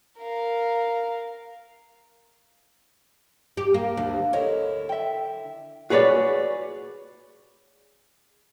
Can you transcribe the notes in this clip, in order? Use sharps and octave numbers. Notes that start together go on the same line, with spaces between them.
A#4 F5
G4
A#3
D2
D3 E4 A#4 C#5 D#5
E5 G5
F#4 G#4 B4 C#5 D5